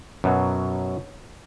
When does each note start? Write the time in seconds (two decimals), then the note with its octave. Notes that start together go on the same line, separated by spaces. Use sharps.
0.24 F#2 B2 F#3